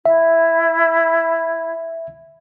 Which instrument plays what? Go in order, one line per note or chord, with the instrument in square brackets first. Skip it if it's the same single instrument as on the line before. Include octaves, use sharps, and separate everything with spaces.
[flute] E4 [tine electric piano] E5